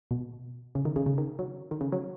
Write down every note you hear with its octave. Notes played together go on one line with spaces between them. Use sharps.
B2
C#3
D#3
C#3
C#3
D#3
F#3
D#3
C#3
F#3